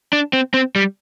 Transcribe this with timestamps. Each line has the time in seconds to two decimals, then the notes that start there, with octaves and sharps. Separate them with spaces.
0.13 D4
0.33 C4
0.54 C4
0.76 G3